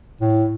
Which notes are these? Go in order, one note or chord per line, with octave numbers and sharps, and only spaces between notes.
A2